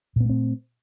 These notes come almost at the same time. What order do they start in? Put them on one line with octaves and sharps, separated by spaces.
A#2 B3 A3 C4